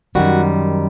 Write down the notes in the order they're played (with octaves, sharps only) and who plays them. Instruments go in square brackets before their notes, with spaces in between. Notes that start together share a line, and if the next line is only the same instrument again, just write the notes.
[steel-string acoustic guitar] F#2 D#3 G3 F#4